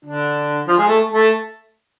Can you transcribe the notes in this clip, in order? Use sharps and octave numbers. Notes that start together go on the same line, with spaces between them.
D3 D4
F3 F4
G#3 G#4
A3 A4
A3 A4